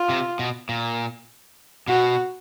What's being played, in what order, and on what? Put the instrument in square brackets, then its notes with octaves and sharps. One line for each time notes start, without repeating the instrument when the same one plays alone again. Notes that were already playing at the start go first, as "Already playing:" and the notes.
Already playing: [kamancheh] F4
[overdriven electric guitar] C3
B2
A#2
[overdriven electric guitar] B2 [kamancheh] F#4